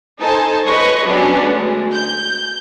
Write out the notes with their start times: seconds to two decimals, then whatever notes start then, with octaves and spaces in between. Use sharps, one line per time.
0.20 D#4 A4 C5 G#5 A5
0.67 B4 C#5 D#5 C#6
1.07 F#3 G3 B3 C#4 D4
1.42 D2 G#3
1.93 G6